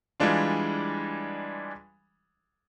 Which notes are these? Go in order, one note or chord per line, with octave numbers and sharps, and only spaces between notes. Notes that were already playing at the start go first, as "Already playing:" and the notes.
E3 G3 G#3 D4 F4